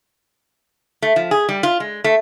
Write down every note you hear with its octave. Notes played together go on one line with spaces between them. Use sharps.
A3
F3
G#4
G3
F4
G#3
A3